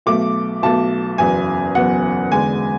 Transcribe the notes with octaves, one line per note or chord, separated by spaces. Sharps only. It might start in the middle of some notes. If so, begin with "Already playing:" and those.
B1 B2 A3 D6
B1 B2 A3 A5
F#1 E2 B2 G#5
F#1 E2 B2 F#5
E2 D3 G#3 G#5